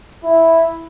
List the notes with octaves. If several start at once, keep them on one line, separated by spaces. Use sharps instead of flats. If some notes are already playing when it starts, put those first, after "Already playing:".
E4